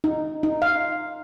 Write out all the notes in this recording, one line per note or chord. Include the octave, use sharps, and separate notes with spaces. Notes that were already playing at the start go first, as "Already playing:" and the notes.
D#4
D#4
F5